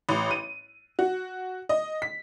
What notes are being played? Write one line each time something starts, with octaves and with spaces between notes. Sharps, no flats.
A1
D#7
F#4
D#5
B6